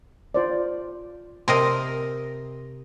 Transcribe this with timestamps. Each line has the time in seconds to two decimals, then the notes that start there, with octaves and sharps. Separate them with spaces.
0.34 F4 C5 D5
1.48 C3 A#4 D#5 G5 C6